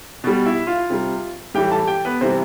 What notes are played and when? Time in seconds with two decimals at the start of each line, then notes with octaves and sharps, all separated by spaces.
0.24 B2 G3
0.46 E4 E5
0.67 F4 F5
0.90 C3 G3
1.54 A2 E3 G3 G4 G5
1.71 A4 A5
1.87 G4 G5
2.05 B3 B4
2.21 C3 E3 G3 C4 C5